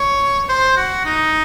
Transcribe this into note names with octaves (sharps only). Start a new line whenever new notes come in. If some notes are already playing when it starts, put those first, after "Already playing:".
Already playing: C#5
C5
F#4
D#4